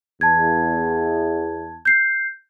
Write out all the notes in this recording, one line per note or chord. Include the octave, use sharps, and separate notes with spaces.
E2 A5 G#6
G6 C7